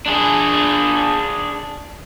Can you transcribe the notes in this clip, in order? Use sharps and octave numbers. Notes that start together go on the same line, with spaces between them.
D4 G#4